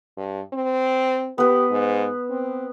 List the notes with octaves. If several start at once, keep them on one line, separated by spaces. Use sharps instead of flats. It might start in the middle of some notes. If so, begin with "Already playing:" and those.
G2
C4
B3 G4 B4
G#2
C4